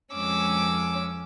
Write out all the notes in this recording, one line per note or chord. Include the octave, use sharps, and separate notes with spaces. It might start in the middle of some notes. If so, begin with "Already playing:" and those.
F2 G#3 C#4 D6 E6